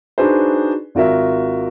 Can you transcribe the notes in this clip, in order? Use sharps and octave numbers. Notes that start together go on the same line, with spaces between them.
D4 D#4 F#4 G#4 B4 C5
G#1 F4 F#4 A#4 E5